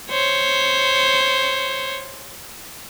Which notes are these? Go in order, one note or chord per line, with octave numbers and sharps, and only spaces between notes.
C5 C#5